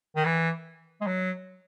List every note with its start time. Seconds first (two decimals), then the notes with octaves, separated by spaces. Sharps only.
0.16 D#3
0.25 E3
1.01 G#3
1.07 F#3